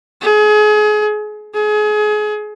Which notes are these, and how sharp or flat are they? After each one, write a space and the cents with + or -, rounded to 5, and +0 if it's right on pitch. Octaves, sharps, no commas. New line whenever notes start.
G#4 +30
G#4 +30